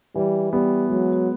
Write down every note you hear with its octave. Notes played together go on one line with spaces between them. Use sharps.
E3 G3
G3 B3
F#3 G#3